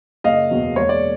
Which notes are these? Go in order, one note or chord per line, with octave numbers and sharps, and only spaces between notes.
F#1 D#5 F5
E2 B2 F#3
E1 C#5
D5